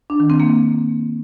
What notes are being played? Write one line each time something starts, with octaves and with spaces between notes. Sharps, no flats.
D4
D#3
C4
A#3